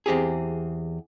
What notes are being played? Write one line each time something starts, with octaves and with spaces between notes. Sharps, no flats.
E2 C4 G4 G#4